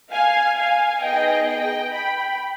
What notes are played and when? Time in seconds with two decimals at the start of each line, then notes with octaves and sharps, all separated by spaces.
0.12 F5 G#5
0.58 F5 G#5
1.03 B3 D#4 G#4 D#5 G5
1.48 D#5 G5
1.94 G5 B5